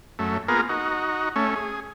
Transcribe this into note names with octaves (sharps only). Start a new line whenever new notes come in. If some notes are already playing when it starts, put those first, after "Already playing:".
F#2 A3
A#3 B3 F4 G#4 A#4
D#4 F#4
A3 C#4
G#4